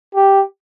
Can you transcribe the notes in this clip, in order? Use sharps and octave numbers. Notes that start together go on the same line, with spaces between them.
G4